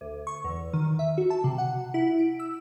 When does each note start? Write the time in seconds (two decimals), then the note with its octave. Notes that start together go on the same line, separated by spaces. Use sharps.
0.01 D2
0.27 C#6
0.44 E2
0.73 D#3
0.99 E5
1.18 F#4
1.30 A5
1.44 C3
1.58 F#5
1.94 E4
2.18 D7
2.39 E6